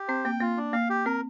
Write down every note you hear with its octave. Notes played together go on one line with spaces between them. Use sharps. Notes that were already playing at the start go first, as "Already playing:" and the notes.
Already playing: G4
C4 C5
A#3 G5
A#3 F4
D4
A#3 F5
G4
C4 A#4